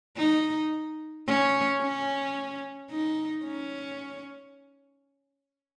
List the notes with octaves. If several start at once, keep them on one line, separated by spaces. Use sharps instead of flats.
D#4
C#4
C#4
D#4
C#4